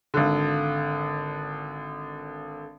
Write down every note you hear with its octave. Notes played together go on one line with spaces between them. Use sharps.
G#1 D3